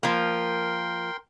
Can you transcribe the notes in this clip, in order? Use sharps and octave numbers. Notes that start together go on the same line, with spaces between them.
F3 A#3 A#4 G5 C6